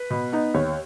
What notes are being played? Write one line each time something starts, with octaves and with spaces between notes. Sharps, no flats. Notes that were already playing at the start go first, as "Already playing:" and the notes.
Already playing: B4
B2
B3 D#4
D#2 C#5